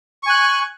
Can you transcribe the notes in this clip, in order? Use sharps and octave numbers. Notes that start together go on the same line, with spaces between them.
G#5 C#6 F#6